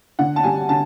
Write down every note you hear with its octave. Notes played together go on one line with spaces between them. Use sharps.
D3 F#5
A5
G3 G#5
D3 A5